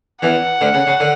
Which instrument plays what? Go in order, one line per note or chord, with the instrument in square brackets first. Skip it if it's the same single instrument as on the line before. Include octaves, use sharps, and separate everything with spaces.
[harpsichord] E2 E3 [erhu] F#5
[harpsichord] D2 D3
C#3
C#3
D3